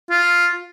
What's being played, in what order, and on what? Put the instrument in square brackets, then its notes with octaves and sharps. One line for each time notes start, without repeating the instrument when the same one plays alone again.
[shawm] F4